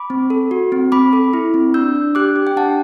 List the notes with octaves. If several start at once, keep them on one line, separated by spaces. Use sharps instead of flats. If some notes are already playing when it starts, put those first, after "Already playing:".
Already playing: B5 D6
C4
A4
F#4
C4
C4 B5 D6
A4
E4
C4
D4 E6 G6
D4
G4 D6 F#6
G4
G5
D4 F#5 A5